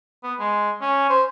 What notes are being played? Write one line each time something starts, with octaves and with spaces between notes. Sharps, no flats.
B3
G#3
C#4
C5